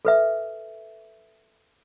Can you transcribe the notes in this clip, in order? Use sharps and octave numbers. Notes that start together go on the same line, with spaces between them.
A4 B4 E5